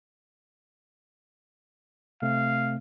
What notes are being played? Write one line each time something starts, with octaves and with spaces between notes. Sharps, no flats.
C3 A3 C4 F5